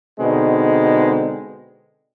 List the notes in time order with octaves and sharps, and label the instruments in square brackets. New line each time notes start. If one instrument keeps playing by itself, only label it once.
[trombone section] B2 D3 G#3 C4 D#4